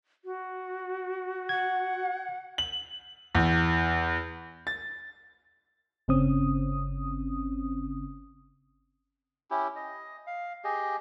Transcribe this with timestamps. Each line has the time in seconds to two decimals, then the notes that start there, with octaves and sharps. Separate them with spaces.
0.25 F#4
1.49 F#5 G#6
2.58 F#7
3.35 E2
4.67 A6
6.08 G1 C#3 C4 C#4 D#6
9.51 C#4 E4 G4
9.76 D#5
10.27 F5
10.64 G4 G#4 D#5